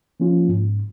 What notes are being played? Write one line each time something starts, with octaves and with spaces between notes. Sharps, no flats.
F3 A#3 C#4 F4
G#2